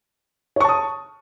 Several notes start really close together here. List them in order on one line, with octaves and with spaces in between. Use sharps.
C#5 C#6 A5 D#6